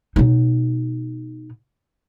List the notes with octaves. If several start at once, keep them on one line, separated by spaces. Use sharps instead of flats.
B2 D#4